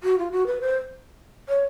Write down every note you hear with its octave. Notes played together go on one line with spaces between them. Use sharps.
F#4
F4
F#4
B4
C5
C#5